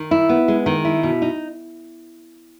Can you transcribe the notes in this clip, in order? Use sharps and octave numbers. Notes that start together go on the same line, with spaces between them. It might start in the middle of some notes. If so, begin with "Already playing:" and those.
Already playing: D#3
E4
B3
G#3
D#3
E4
B2
D#4